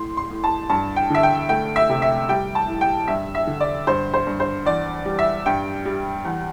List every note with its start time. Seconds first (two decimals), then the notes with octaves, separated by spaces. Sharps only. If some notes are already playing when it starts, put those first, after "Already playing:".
Already playing: A2 C6
0.17 C6
0.30 A2
0.44 A5
0.70 G2 A5
0.96 G5
1.10 D3 E5
1.23 G5
1.49 A3 G5
1.76 E5
1.90 C3
2.02 E5
2.29 G3 G5
2.55 A5
2.68 A2
2.81 G5
3.08 G2 E5
3.35 E5
3.47 D3
3.60 D5
3.87 G2 C5
4.14 C5
4.27 G2
4.40 C5
4.66 E2 D5
5.05 G3
5.19 E5
5.46 G2 G5
5.85 G3
6.25 E2